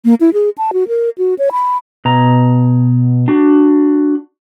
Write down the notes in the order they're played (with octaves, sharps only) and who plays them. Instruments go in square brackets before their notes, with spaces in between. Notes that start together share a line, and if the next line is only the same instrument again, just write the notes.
[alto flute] A#3
E4
G#4
A5
F#4
A#4
F#4
C#5
B5
[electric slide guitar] B2 A#5
D4 F#4